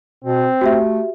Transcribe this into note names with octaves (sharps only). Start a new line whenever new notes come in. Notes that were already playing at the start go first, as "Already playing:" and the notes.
B2 C4
A3 F#4 G4 E5